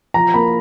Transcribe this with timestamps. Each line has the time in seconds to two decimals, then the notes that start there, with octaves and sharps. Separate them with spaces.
0.14 F3 A#5
0.34 A#3 B5